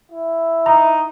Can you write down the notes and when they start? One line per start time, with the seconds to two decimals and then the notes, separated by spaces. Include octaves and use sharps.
0.12 E4
0.66 D#4 A#5